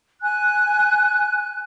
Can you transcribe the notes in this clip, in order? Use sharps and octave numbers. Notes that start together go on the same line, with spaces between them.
G#5 F#6